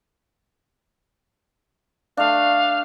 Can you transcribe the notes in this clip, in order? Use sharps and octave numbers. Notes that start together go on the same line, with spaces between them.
A3 D4 F5